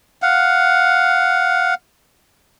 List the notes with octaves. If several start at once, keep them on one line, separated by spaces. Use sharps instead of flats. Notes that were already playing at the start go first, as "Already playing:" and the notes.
F5 F#5